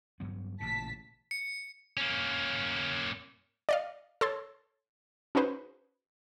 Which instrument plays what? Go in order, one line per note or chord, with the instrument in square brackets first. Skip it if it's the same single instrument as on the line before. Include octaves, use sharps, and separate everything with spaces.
[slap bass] G2 F#3 B3
[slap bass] A1 A#2 C#3 [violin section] A5 B6
[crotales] C#7
[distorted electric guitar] A#3 C#4
[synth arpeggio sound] D5 D#5 F5
A4 C#5 C6 G#6 A6
C#4 D#4 F#4 G#4 B4 C5